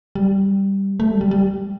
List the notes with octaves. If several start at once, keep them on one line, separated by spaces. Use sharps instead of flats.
G3
A3
G3
G3
G3